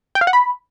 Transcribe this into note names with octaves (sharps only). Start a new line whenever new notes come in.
G5
F5
F#5
B5